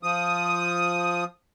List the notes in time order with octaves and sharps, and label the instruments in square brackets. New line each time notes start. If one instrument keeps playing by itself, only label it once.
[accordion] F3 D#6